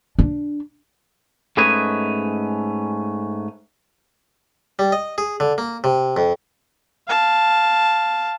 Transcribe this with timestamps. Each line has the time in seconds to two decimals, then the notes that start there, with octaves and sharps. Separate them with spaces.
0.19 D4
1.57 G#2 A3 C#4 B4 D#5 G#5
4.79 G3
4.92 D#5
5.18 G#4
5.40 D3
5.58 A#3
5.84 C3
6.17 F2
7.08 F5 A5